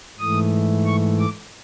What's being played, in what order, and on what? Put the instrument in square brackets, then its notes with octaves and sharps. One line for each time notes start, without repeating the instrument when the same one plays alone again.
[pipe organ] G#2 E3 A3 D#6
C#6
D6